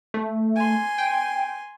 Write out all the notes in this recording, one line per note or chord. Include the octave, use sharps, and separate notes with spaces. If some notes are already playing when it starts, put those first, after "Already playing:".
A3
G#5 C6
G5